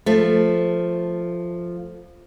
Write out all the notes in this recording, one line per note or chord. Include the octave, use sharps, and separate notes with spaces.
F3 A3